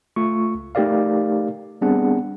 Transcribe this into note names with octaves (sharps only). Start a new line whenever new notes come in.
A3 F4 C#6
C#2
A3 D#4 G4 A#4 D5 F5
G3 B3 C4 D4 G#4 F#5